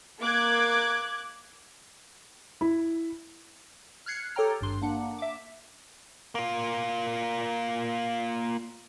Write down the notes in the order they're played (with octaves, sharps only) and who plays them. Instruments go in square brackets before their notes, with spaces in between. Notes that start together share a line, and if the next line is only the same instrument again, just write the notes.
[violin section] A#3 D6 F#6 G#6
[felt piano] E4
[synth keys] F6 F#6 G#6 C7 C#7
G4 A4 C#5 G5 A#5 F6
G#1 G2 C6
A#3 D4 F#5
E5 D6
[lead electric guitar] A#3 F4